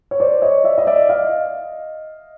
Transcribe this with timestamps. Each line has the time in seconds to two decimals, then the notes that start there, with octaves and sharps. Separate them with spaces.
0.11 C#5
0.20 C5 D5
0.42 C#5 D#5
0.64 D5 E5
0.78 D#5
0.87 D5 E5
1.09 D#5 F5